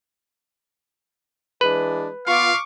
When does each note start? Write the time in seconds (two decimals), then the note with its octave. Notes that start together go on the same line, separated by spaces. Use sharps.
1.61 E3 G#3 D4 B4
2.26 B3 F4 F5 C#6 D6